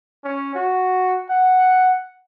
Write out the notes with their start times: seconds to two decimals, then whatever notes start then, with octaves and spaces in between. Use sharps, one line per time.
0.24 C#4
0.55 F#4
1.29 F#5